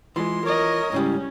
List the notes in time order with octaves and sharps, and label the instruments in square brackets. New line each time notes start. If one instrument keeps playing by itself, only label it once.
[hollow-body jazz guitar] E3 [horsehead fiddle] G#3 [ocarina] F4 [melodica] C6
[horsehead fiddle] A#4 D#5 [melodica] C#5
[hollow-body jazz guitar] G#2 C#3 G3 [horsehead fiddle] C#4 [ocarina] E4